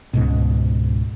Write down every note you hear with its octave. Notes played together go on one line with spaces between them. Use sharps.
C#2 G#2 B2